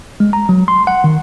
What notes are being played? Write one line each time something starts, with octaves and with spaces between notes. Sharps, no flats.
G#3
A#5
F#3
C6
F#5
D#3